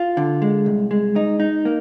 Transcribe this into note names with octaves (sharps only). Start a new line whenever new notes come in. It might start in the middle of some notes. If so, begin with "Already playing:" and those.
Already playing: F4
D3
G#3
C2
G#3
D#4
D#4
A#3